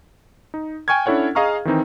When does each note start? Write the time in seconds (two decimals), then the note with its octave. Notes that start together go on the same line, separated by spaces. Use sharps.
0.54 D#4
0.88 G5 G#5 C#6 F6 G#6
1.06 C#4 D4 E4 A4 C#5 F#5
1.35 G#4 D#5 F5 A#5 C#6 F6
1.65 D#3 E3 C4 D#4